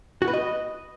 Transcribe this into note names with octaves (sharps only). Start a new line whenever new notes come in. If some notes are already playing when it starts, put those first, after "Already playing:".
F#4
B4
D#5